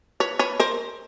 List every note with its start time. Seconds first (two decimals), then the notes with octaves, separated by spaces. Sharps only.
0.20 B4 C#5
0.39 B4 C#5
0.60 A#4 C5